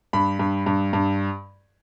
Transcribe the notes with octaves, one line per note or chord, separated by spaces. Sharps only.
G2 B5
G2
G2
G2